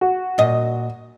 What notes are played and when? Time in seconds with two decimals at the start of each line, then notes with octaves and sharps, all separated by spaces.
0.01 F#4
0.38 A#2 D#5